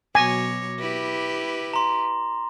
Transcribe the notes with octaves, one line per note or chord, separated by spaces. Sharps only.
B2 F#3 C#5 G#5 D6 A#6
E4 G4 B4
A#5 C6